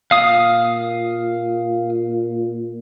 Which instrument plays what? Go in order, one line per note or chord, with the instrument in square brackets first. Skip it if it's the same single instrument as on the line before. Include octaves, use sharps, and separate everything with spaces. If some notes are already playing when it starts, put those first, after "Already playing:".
[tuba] A#2 [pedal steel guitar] F5 D#6